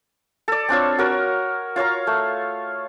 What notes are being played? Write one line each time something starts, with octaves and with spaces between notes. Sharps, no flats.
A4 D5
C4 D4 F4 C#5
F#4 A#4 C#5
F4 C#5 F5 A#5
A3